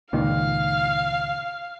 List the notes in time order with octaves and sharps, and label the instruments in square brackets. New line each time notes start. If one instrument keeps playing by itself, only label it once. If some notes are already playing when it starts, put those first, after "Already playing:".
[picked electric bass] C#2 A#2 D#3 [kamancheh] F5